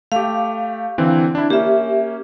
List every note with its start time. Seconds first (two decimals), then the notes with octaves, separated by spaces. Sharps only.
0.12 A3 G4 F5
0.98 D3 E3 C4
1.35 D4 E4
1.50 A#3 C#4 G4 E5